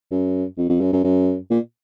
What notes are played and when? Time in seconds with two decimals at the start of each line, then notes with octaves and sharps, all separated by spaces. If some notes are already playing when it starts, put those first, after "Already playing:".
0.11 F#2
0.58 F2
0.69 F2
0.81 F#2
0.93 F#2
1.04 F#2
1.50 A#2